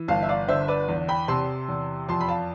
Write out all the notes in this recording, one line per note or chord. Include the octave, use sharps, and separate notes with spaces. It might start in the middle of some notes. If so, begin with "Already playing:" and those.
Already playing: E3
G1 F5 A5
E5
D5 F5
D3 C5 E5
B4 D5
E2
G5 B5
C3 A5 C6
E2
F2 A5 C6
B5
F5 A5